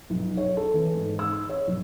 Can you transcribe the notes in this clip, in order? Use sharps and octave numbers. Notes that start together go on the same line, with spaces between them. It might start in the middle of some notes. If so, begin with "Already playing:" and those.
B1
C#5
A4
E3
G#2
E6
C#5
B1